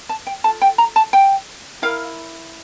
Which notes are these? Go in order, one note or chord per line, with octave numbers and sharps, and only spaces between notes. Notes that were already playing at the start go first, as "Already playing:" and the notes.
A5
G5
F4 A4 A5
G5
A#5
A5
G5
E4 A#4 F5